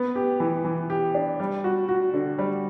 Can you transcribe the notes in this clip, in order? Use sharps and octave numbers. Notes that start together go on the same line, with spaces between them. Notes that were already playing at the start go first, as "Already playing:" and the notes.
Already playing: B3
G4
E3
E3
G4
D4
G3
F#4
F#4
D3
G3